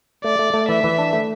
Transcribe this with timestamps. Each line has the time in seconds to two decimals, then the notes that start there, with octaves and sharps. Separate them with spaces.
0.24 A3 D5
0.39 A3
0.54 A3
0.69 E3 E5
0.84 E3
0.99 D4
1.13 A3